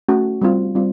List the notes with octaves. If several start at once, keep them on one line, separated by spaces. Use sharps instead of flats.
A3 C#4 F#4
G3 C4 F4
G3 C4 F4